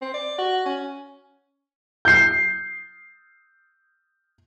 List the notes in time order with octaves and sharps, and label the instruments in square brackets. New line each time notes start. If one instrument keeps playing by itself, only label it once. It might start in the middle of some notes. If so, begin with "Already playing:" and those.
[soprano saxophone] C4
D5
F#4
C#4
[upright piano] G6 C7